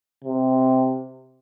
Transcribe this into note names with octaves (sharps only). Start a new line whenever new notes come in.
C3